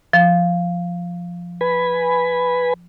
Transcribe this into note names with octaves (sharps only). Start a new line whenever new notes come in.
F3
B4 G#5 B5